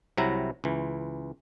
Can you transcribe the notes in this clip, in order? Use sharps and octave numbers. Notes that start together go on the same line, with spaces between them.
C2 C3 F#3 E4 A#5
C#2 E3